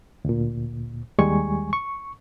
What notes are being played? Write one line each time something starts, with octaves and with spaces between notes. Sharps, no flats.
D2 A#2
D#2 G3 G#3 G#5 C#6
C#6